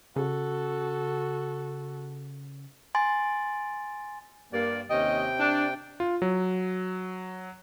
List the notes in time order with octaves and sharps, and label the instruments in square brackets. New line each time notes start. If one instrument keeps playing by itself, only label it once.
[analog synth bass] C#3 [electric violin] F#4 A4
[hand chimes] G#5 C6 A6
[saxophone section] G2 A#3 [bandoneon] D5
[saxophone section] D#2 C#4 D#5 [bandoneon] C3 G5
[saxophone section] D4
[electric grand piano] F4
F#3